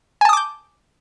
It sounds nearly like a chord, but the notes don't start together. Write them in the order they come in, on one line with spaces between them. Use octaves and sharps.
G#5 A5 D#6 D6 G6